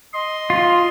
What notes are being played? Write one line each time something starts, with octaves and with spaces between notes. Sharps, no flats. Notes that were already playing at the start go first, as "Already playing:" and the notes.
D#5 C6
F4